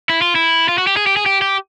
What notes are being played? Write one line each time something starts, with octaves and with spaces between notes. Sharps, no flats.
E4
F4
E4
F4
F#4
G4
G#4
G4
G#4
G4
G4